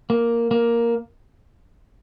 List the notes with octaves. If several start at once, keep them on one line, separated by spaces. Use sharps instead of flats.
A#3
A#3